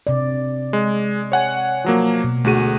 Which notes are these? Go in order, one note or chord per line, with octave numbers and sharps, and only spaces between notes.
C3 D5
G#3
C#5 F#5 G#5
F3 F#3 A#3
B2
D2 A3 F#4 G#4 D#7